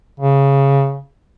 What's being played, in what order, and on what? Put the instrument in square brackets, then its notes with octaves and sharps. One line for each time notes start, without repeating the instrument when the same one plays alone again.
[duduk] C#3